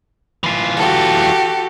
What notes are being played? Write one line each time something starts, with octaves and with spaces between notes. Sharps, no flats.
E3 F4
F#4 G4 A4